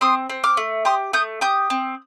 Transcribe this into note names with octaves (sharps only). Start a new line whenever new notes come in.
C4 C6 D#6
C4
D6 F6
A3
G4 C6 D#6
A3 D#6 G6
G4 D#6 G6
C4